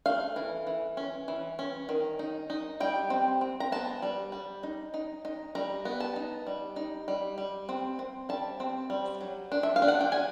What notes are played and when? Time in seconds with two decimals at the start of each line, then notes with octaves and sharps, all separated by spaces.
0.06 A3 F5
0.36 E3
0.67 E3
0.97 C#4
1.28 E3
1.59 C#4
1.89 D#3
2.19 D#4
2.50 D#4
2.80 G3 G5
3.10 C4
3.41 C4
3.60 A#5
3.72 B3 A5
4.02 G3
4.32 G3
4.63 D#4
4.94 D#4
5.25 D#4
5.55 G3 A#5
5.85 B3
6.00 A5
6.16 D#4
6.47 G3
6.76 D#4
7.08 G3
7.38 G3
7.69 C4
7.99 C4
8.29 G3 A5
8.60 C4
8.90 G3
9.21 F#3
9.52 D4
9.63 E5
9.76 F5
9.82 D4
9.88 F#5
10.01 G5
10.12 D4 G#5